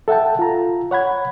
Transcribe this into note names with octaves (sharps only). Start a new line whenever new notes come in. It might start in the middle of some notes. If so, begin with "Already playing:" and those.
A4 E5 F#5 G5 A5
F4 A#5
C#5 F#5 B5 G#6